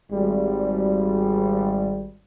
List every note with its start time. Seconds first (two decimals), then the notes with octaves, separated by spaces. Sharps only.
0.11 G#1 G3